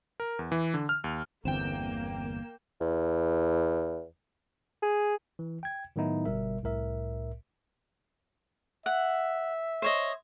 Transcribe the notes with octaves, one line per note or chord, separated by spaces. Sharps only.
A#4
E2
E3
D3
F6
D#2
G1 E2 D3 A#3 C4 G5 E7
E2
G#4
E3
G5 G#6
A2 D#3 F#3 B3 D#4 E4
G1 B2 G3 A#4 E5
C2 A2 A#4 E5
E5 F#5
C5 C#5 D#5